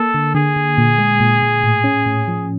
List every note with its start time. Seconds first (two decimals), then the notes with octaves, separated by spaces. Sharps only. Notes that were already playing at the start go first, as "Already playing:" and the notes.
Already playing: A#3 A4
0.14 D3
0.34 D3 G#4
0.56 D3
0.78 A#2
0.98 G#3
1.20 A#2
1.42 A#2
1.63 A2
1.84 C#4
2.06 A2
2.28 F3